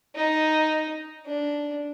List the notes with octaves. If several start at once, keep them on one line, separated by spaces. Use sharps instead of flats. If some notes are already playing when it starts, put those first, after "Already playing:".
D#4
D4